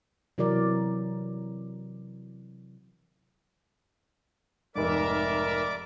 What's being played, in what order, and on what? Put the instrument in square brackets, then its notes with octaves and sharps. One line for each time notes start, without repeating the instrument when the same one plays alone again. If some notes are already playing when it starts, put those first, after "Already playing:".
[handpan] C3 E3 F#3 A#4 D5
[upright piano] F1 G#2 [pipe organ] A#4 E5 [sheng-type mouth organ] D5 D6